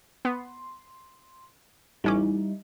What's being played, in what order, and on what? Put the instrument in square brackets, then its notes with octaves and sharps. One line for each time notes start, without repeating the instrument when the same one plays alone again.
[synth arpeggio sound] B3 [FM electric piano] C6
[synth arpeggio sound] A1 C#4 D6 [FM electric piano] G3 D#4 E4